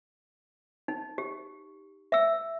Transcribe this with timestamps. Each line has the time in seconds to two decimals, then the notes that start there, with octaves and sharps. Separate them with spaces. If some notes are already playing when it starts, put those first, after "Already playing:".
0.88 D#4
1.18 G4
2.12 E5 E6